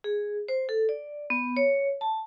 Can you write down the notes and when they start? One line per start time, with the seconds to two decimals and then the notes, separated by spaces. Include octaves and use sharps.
0.04 G#4
0.48 C5
0.69 A4
0.89 D5
1.30 B3
1.57 C#5
2.01 A5